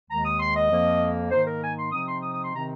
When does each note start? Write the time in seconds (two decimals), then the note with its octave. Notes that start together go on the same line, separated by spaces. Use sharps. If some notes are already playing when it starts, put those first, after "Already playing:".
0.09 D#2 D#3 G#3 A#5
0.25 D#6
0.39 C6
0.56 D#5
0.70 F2 F3 A#3
1.31 G#2 D#3 A#3 D#4 C5
1.47 A#4
1.62 G#5
1.78 C6
1.92 C3 F3 C4 D#4 D#6
2.07 C6
2.23 D#6
2.33 D#6
2.43 C6
2.54 C3 D#3 C4 D#4 A#5